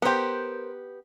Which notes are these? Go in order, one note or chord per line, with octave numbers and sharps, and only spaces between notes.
B3 G4 A#4 C5